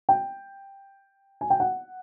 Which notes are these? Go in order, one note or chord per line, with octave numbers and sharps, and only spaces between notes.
G5
G#5
G5
F#5